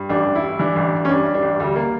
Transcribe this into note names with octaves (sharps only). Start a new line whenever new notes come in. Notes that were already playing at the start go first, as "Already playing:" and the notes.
Already playing: G2
A1 D4
A1
E4
G2
E3 D4
A1
A1
C#4
G2 D4
G2
D4
A1
D2 G3
A#3